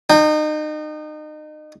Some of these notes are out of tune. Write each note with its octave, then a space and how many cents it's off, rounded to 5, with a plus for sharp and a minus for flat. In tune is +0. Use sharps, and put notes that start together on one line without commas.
D#4 -30 G5 +0